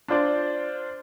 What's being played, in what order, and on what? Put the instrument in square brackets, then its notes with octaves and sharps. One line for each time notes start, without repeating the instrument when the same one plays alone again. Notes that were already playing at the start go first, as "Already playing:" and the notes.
[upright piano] D4 F4 C5 D5